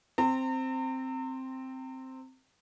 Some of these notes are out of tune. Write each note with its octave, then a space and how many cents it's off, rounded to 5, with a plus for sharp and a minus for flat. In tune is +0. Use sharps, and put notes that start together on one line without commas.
C4 +0 A#5 -40